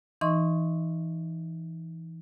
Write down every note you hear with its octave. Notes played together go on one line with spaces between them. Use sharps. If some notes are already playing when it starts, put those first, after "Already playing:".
E3 D#4 D#5 C6 C#6